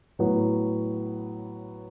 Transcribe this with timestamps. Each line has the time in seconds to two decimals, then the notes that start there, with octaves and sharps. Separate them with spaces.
0.19 A2 F#3 B3